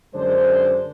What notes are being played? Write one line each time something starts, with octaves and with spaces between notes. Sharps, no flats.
F#2 D3 G#3 D4 C5